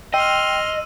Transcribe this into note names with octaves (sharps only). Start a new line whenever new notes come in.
D#5 G5 C6 E6 F6 D#7